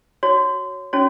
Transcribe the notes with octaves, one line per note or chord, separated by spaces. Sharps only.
F#4 C#5
C#4 F#4 C#5